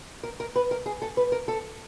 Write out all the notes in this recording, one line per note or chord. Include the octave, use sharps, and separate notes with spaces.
A#4
A#4
B4
A#4
G#4
A4
B4
A#4
A4